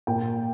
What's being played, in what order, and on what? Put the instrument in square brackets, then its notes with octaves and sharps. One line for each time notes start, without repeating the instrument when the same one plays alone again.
[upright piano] A#2 G5